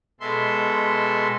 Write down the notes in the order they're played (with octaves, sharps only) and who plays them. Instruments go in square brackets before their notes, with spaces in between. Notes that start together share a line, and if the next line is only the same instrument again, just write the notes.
[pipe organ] B2 G#3 A4 E5 C6